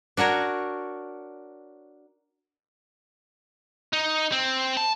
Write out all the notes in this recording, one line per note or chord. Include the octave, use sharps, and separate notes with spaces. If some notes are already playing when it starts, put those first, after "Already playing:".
D4 F#4 A#4 C#5
D#4
C4
A5